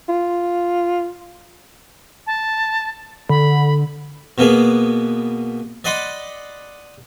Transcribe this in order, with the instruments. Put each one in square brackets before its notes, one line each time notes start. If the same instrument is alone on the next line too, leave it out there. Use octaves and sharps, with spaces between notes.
[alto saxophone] F4
[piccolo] A5
[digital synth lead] D3 [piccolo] B5
[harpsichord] B2 A#3 B3 G#4
D5 D#5 F#5 B5 C6 D6